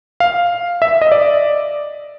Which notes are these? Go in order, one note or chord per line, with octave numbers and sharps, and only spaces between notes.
F5
E5
D#5
D5